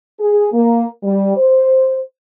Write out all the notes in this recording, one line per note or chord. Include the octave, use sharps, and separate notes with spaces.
G#4
A#3
G3
C5